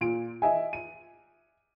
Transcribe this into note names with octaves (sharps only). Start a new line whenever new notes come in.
A#2 D7
D#5 E5 G#5
D#7